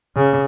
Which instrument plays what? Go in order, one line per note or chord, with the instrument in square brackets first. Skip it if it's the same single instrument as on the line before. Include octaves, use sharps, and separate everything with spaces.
[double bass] C#3